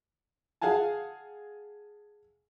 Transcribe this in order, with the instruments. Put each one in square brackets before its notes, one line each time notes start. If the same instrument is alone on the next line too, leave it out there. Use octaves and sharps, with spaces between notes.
[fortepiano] G#4 F5 F#5 G#5 A5